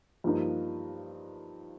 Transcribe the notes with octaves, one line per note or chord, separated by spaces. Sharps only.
G2 F3 A#3 D#4